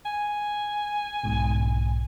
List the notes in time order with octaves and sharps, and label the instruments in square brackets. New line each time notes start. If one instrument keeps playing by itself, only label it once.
[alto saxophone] G#5
[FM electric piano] B1 G#2 B2